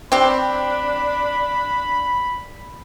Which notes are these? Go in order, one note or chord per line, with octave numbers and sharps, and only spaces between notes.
C4 D4 G4 B5